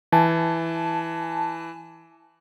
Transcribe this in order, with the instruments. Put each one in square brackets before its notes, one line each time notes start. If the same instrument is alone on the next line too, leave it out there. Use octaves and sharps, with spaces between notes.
[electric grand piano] E3 [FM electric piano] G#5 A5